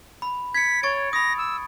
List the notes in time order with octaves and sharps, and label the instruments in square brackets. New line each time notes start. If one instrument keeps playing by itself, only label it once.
[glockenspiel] B5
[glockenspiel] G#6 C#7 [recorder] B6
[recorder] C#5 [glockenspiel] C#6 A6 D7
[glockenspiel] B5 D#6 [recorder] A#6
[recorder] E6